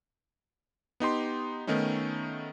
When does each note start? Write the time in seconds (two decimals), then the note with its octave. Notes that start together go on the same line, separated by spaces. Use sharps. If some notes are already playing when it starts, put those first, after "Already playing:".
1.00 B3 D#4 G4 C6
1.67 D#3 A3 B3 C#4 D#4